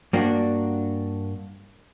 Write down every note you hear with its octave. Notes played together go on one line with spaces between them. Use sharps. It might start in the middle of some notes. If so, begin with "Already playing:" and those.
G2 A#3 D4 F#4